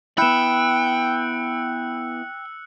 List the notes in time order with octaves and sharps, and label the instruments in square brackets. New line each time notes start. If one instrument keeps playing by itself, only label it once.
[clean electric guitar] B3 E4 [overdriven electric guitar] G5 [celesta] B5 E7 [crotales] E6 F#6 C#7